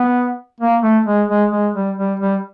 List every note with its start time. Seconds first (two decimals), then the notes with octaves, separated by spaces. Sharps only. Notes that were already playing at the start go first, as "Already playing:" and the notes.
Already playing: B3
0.60 A#3
0.82 A3
1.06 G#3
1.28 G#3
1.52 G#3
1.75 G3
1.98 G3
2.20 G3